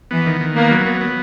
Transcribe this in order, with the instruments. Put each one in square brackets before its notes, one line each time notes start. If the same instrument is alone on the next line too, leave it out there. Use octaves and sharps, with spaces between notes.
[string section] E3 [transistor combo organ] B3
[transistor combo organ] D#3
D#3
[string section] A#3 [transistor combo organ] B3
[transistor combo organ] F#3
B3
B3